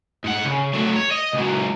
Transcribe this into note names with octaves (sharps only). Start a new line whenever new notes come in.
G#2 F#5
C#3
F#3 A3
C#5
D#5
C#2 F#3